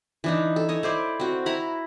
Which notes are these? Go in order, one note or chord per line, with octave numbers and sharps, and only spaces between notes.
E3 D4 D#4
A4
C#5 D#5
E4 C5 D5
C4 F#4
E4 A#5 B5